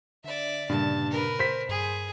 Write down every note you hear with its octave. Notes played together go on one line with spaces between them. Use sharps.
D3 D5 E5
G2 A#2 C#3 A#3 A5
A#4 B4
C5 B6
G2 G#4